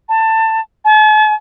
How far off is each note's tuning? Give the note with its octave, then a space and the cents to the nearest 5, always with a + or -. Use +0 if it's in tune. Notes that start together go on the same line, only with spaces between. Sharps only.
A5 +20
A5 -45